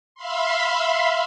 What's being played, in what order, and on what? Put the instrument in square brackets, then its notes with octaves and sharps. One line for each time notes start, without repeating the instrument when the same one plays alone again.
[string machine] E5 F5 B5 C6